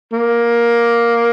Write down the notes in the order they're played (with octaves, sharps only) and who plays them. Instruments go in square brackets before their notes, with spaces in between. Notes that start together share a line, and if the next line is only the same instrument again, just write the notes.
[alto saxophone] A#3